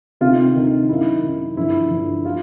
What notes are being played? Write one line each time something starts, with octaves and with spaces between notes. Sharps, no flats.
D2 C3 D#3 F4
D2 C3 D#3
F#2 D#3 E4
F#2 D#3
G2 D3 F3 E4
G2 D3 F3
F4